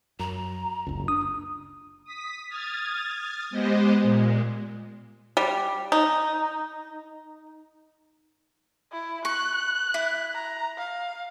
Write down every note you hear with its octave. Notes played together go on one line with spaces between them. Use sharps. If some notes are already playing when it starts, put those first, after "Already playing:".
F#2 A#5
F#1 C#2
D4 D#6
D#6 B6
D#6 F6 G#6 A6
G#3 B3 G4 C5 D#5
A#2 G#3
G3
D#4
E4
C#6 F#6
E4
A#5
F5